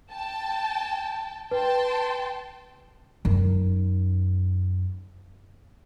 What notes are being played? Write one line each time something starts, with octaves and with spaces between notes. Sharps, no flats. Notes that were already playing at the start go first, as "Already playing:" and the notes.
G5 A5
B4 G5 A5 C6
F#2 D#4